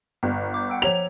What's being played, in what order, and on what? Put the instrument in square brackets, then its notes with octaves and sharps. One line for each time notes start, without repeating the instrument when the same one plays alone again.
[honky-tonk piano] G1
[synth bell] D6 G6
F#5 G5 E6
[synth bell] F3 C#5 A#5 [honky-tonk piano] F7